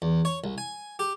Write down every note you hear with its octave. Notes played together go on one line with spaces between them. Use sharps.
E2
C#5
C2
G#5
G4